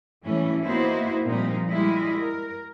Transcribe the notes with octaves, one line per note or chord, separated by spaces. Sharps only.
A2 E3 G3 A3 C#4 E4
A#3 B3 D#4 E4 F#4 C5
A#2 F3 G3 C4 D#4
G3 G#3 E4 F4 D#5
A#4